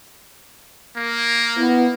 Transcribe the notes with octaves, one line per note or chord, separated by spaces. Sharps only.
A#3
B3 E4